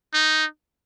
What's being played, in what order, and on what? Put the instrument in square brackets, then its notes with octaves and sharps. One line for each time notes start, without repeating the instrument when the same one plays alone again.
[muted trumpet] D#4